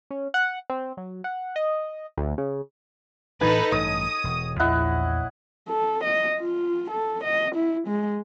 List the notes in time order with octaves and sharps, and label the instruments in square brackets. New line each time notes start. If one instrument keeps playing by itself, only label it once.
[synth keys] C#4
F#5
C4
F#3
F#5
D#5
D2
C#3
[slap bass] A2 E3 D4 [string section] D#4 A4 B4 [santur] G#5
[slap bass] A1 G2 [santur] C#5 D#5 [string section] D#6
[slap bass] E1
[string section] A#1 [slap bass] E2 [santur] E4 D#5 F#5
[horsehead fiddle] A4
D#5
F4
A4
D#5
E4
G#3